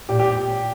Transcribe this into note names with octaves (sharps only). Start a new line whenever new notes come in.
A#2 G4
G4